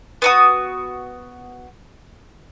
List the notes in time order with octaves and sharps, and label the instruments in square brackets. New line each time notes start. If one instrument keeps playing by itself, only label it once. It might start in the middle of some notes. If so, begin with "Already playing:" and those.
[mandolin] B3 F#4 D#6